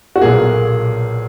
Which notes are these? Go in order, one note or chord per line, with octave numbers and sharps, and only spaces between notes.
F#4
B1 A#2 A#3 G#4